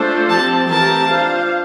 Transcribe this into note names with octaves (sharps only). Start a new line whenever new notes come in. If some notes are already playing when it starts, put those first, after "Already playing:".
Already playing: A3 D4 F4 A4 C5
F3 C4 G4 A5
E3 A3 C4 G4 A#4 A5
D4 F4 C5 F5